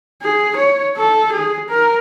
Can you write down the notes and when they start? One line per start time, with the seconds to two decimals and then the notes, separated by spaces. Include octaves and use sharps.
0.23 G#4
0.57 C#5
0.97 A4
1.32 G#4
1.69 A#4